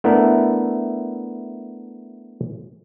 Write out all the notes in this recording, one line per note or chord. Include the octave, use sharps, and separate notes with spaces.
A3 B3 D4 E4 A#4